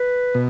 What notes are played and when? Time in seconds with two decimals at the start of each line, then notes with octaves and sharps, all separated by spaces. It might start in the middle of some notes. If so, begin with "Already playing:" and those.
Already playing: B4
0.35 B2